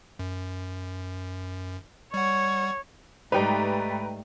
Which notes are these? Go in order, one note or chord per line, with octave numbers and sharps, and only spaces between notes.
F#2
G3 C#5 F#5
G#2 G3 A3 D#4 B4 G5 A#5